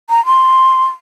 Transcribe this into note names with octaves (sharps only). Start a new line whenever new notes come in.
A#5
C6